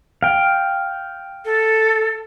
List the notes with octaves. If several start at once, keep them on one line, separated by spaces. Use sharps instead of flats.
F5 G5
A4